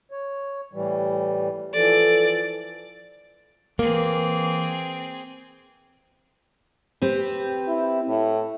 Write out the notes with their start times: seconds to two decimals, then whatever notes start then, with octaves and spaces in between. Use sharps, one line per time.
0.11 C#5
0.73 A2 E3 G3
1.74 E3 F3 A4 D5
3.79 E3 A#3 C4 G#4
7.02 C4 G4 B4
7.67 E4
8.08 A2